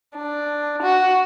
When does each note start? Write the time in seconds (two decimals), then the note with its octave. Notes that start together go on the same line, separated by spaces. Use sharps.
0.17 D4
0.82 F#4